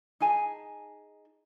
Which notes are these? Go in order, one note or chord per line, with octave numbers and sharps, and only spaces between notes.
D#4 G#4 G#5 A5